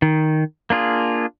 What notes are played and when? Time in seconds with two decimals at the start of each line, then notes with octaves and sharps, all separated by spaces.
0.02 D#3
0.70 A#3 D4 F4 G#4